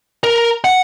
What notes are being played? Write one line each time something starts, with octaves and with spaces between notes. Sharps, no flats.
A#4
F#5